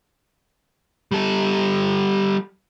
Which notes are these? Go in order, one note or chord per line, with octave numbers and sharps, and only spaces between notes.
G3 A4